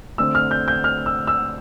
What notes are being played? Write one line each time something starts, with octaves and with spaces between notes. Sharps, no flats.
D3 A3 C4 E6
F6
G6
G6
F6
E6
E6